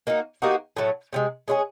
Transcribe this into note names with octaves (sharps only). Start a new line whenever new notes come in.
A#3 D#4 F#4
G3 A#3 D#4 F#4
A2 F#3 A3
C3 F3 G#3
G#3 C#4 E4 G#4